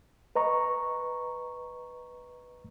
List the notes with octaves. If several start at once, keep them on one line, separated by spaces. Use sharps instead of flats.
B4 D#5 A#5 C#6